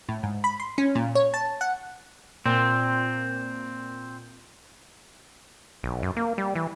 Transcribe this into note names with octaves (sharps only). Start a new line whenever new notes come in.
A2
G#2
B5
C6
C#4
A#2
C#5
A5
F#5
A#2 C4
B1
F#2
A#3
G3
E3